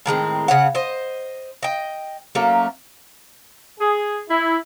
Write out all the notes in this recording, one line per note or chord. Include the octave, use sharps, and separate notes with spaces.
A2 D#3 G#3 C4
C#3 C#5 F#5
C5 D#5
D#5 G5
F#3 A3 A#3 C#4
G#4
E4